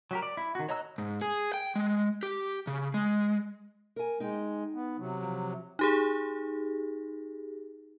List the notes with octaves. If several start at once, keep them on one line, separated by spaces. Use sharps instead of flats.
F#3 G4 A#4
D5
E4
D#3 F#4
C#5 D#5 A#5 E6 F#6
G#2
G#4
G5
G#3
G4
C#3
G#3
A#4 G#5
G#3 D#4 G5
B3
C3 F#3
F3
D#4 G4 G#4